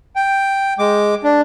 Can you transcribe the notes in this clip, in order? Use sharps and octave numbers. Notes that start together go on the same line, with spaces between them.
G5
G#3 D6
D4